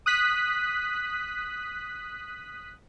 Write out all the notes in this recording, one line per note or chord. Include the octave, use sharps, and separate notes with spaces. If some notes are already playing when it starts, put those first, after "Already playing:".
D#6 F#6 B6